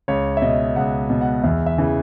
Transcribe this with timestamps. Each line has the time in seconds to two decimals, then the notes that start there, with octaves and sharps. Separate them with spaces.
0.08 C#2 C#5
0.37 E5
0.42 B2 D#5
0.76 C#2 F#5
1.10 B2
1.21 F#5
1.44 E2 E5
1.66 E5
1.78 C#3 E3